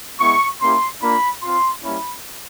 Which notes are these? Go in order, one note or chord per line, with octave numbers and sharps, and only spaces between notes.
G#3 B3 E4 C#6
A#3 C#4 E4 G4 C6
A#3 D4 F4 B5
C4 F4 C6
G3 A#3 C#4 E4 B5